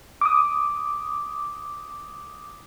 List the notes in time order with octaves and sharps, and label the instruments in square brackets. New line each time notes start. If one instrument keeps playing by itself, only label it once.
[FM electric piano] D6 D#6